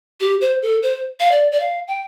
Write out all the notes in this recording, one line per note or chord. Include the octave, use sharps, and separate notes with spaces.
G4
C5
A4
C5
F5
D5
D5
F5
G5